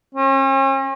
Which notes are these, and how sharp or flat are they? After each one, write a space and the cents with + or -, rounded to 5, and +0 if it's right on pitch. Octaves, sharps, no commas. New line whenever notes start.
C#4 -45